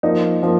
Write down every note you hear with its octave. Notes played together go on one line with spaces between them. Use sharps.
F3 A#3 D#4
F3 A#3